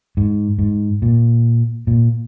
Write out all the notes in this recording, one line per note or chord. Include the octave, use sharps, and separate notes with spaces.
G#2
G#2
A#2
A#2